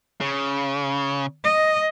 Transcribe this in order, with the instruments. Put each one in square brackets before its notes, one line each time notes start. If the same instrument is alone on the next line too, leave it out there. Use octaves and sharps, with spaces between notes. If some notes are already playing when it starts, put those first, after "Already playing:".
[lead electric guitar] C#3
[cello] D#5